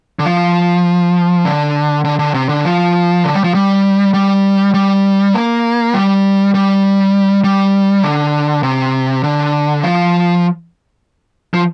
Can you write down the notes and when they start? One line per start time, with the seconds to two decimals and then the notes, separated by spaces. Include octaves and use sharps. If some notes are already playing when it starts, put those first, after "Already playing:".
0.19 D3
0.25 F3
1.45 D3
2.05 D3
2.19 D3
2.34 C3
2.49 D3
2.65 F3
3.24 D3
3.34 G3
3.44 F3
3.54 G3
4.14 G3
4.74 G3
5.34 A#3
5.94 G3
6.54 G3
7.44 G3
8.03 D3
8.63 C3
9.23 D3
9.83 F3
11.54 F3